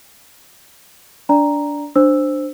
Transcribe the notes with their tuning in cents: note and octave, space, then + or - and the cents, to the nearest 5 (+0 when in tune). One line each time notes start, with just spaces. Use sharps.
D4 -15 D5 +0 A#5 +0
D4 +10 C5 +0 E6 +0